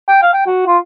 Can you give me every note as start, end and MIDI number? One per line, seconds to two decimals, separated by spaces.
0.09 0.18 79
0.22 0.33 77
0.33 0.46 79
0.47 0.64 66
0.67 0.78 65